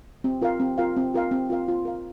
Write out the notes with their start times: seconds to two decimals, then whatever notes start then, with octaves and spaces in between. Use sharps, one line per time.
0.24 C4
0.42 F4 A#4 F5
0.60 C4
0.78 F4 A#4 F5
0.97 C4
1.14 F4 A#4 F5
1.31 C4
1.50 F4 A#4 F5
1.68 F4
1.85 A#4 F5